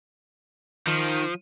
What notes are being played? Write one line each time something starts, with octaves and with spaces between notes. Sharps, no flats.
D#3 F3